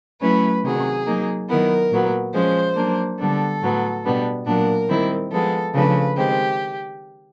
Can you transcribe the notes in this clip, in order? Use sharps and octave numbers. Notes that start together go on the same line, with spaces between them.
F#3 A3 C#4 E4 B4
C3 D#3 F#3 G#4
F#3 A#3 D#4
D#3 F#3 B3 E4 A#4
A#2 F#3 B3
F3 G#3 C#4 C5
F#3 A#3 D4
D3 G3 B3 D4 A4
A2 F#3 B3
B2 G3 B3 D4
A#2 F#3 B3 D4 A#4
D#3 G3 C4 E4
F3 G#3 B3 A4
C#3 F3 A3 D4 B4
D#3 G#3 C4 G4